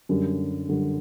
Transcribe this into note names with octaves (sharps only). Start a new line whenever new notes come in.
F#2 D3 G3
F#2 D3 G3